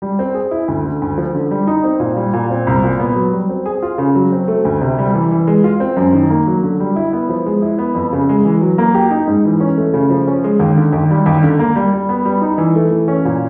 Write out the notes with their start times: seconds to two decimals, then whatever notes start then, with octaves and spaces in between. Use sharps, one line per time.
0.02 G3
0.19 C4
0.34 G#4
0.51 E4
0.68 D2
0.85 D3
1.02 D2
1.18 F3
1.35 D3
1.51 G3
1.67 D#4
1.84 C4
2.00 A#2
2.16 G3
2.33 A#2
2.50 C4
2.67 C2
2.84 A#2
3.00 B3
3.16 F#3
3.32 G3
3.49 C4
3.66 G#4
3.82 F4
3.98 C#3
4.15 F#3
4.32 C4
4.48 A3
4.65 D2
4.81 C3
4.98 G3
5.14 E3
5.31 E3
5.47 G#3
5.64 F4
5.80 C4
5.97 F#2
6.13 D#3
6.30 A#3
6.47 F#3
6.63 D3
6.80 G3
6.96 E4
7.13 B3
7.29 F3
7.46 G#3
7.62 E4
7.78 B3
7.95 F2
8.13 C#3
8.29 G#3
8.45 E3
8.61 F#3
8.78 A#3
8.95 G4
9.11 D#4
9.27 G#2
9.45 E3
9.60 C#4
9.77 A3
9.94 C#3
10.10 F3
10.27 C#4
10.44 G#3
10.59 D#2
10.76 D3
10.93 D#2
11.10 G3
11.26 D#2
11.43 D3
11.59 A#3
11.76 G3
11.93 G3
12.09 B3
12.25 G3
12.42 D#4
12.58 E3
12.75 A3
12.91 E3
13.08 C#4
13.25 A#2